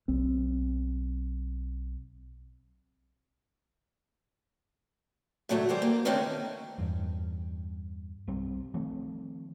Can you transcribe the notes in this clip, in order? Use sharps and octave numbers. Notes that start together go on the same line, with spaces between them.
B1 C4
A2 D3 F#3 G3 A3
E3 G3 C5
A#3
D3 D#3 A3 C4 C#4 D#4
E2 G2
B1 G3 C4
D#3 F3 A3 C4